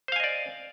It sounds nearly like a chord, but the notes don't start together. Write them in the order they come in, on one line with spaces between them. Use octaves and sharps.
C5 F5 G#5 D#5 D5